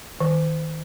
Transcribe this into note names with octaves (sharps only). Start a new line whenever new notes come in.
D#3